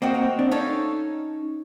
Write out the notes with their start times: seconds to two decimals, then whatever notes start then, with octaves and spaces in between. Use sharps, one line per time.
0.02 A#3 C4 F#4 A#4 D#5 G5
0.14 A#3 C4
0.39 C4 D4
0.51 C#4 D#4 A4 C#5 F5